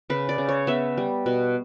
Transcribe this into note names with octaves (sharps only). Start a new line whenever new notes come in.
C#3 B4
D5
C#3
C#5
B3 E5
G3
B2